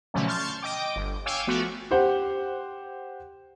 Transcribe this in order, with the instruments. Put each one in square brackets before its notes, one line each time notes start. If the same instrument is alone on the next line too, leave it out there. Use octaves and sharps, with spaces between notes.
[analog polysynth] B2 D3 F3 F#3 A3 C#4
A5 C6 C#6 F6 G6 A6
D#5 G5 D6
G1
C#5 F5 G5 G#5 D6 E6
F3 A3 B3 F#4
[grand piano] G4 C5 F#5